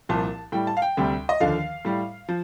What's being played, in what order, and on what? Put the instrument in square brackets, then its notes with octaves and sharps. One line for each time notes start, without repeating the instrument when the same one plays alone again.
[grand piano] C2 A#2 F3 A5
A2 G3 G5
A5
F5
G5
D2 C3 G3
D#5
D#2 D3 F3 F5
A2 G3
F3